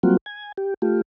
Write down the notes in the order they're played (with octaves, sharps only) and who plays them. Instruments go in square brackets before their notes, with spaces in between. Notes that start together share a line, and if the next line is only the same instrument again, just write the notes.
[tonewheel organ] F#3 G3 A#3 C4 F4 F#4
G#5
G4
A3 F4 G4